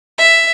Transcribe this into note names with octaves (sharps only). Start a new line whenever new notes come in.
E5